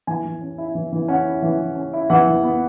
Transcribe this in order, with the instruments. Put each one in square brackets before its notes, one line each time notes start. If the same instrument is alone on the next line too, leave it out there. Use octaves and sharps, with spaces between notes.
[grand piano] E3 G#5
E3
C#4
E4
E3
E3
C#4 F#5
E4
E3
E3
C#4
E4
E3 F#5
E3
B3